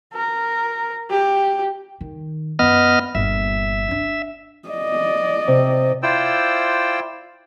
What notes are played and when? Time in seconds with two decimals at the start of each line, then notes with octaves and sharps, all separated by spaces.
0.13 A#4
1.10 G4
2.01 D#3
2.59 F#2 B3 F4 D#5 F6
3.15 G1 A#2 E5
3.88 C#4 D4
4.69 D5 D#5
5.48 C3
6.03 E4 F4 C5 D5 G5 E6